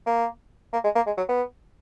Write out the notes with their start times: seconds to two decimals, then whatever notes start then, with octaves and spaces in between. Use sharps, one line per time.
0.06 A#3
0.73 A#3
0.84 G#3
0.96 A#3
1.07 G#3
1.18 F#3
1.29 B3